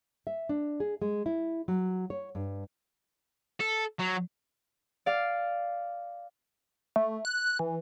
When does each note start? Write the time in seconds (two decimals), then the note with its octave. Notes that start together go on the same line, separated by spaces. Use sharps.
0.27 E5
0.49 D4
0.80 G#4
1.02 G#3
1.26 E4
1.68 F#3
2.10 C#5
2.35 G2
3.60 A4
3.99 F#3
5.06 D5 F5
6.96 A3
7.25 F#6
7.59 E3